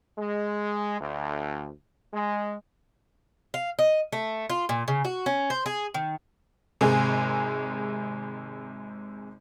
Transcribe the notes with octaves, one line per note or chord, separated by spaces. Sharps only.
G#3
D2
G#3
F5
D#5
A3
F4
A#2
C#3
F#4
C#4
C5
G#4
D#3
G#1 C3 G#3 G#4